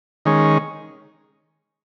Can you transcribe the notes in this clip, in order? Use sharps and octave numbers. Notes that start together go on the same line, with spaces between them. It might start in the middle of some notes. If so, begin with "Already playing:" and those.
D#3 G#3 C#4